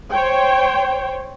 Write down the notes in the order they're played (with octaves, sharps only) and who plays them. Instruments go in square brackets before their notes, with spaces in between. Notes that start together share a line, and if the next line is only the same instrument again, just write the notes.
[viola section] C5 C#5 G5